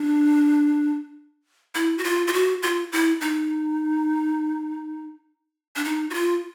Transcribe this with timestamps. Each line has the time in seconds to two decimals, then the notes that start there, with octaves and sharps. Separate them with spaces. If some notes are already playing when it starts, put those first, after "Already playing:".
Already playing: D4
1.75 E4
1.98 F#4
2.04 F4
2.27 F4
2.33 F#4
2.62 F4
2.92 E4
3.21 D#4
5.76 D4
5.84 D#4
6.10 F#4
6.14 F4